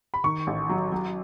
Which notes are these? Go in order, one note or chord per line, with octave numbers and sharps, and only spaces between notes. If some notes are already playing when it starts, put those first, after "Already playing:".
B5
D#3 C#6
A1
F#3
F#3